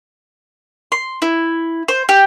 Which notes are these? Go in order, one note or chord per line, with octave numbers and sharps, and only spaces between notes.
C6
E4
C5
G4